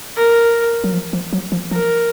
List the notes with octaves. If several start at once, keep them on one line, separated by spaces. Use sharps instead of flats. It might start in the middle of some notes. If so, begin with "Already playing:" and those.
A#4
F#3
F3
F3
F#3
F3
F3 A#4